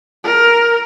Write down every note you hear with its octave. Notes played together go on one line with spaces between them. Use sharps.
A#4